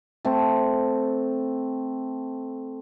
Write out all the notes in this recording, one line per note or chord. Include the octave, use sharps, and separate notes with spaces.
A3 C4